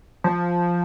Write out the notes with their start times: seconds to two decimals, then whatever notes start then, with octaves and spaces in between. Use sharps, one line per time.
0.24 F3